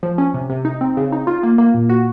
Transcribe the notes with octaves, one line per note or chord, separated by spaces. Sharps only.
F3
C#4
C3
C3
D#4
C4
C#3
D#4
F4
A#3
A#3
A#2
F#4